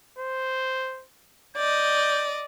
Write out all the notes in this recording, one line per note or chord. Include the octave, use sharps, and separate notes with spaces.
C5
D5 D#5 G6